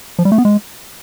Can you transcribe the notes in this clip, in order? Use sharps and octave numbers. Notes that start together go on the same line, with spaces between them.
F3
G3
A3
B3
G#3